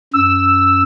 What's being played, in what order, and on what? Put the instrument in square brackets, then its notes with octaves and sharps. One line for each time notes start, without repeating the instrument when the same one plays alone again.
[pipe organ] F#2 [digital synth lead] E6